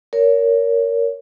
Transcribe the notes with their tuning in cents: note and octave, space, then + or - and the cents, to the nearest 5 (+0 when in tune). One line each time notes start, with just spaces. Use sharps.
A#4 +0 C#5 +25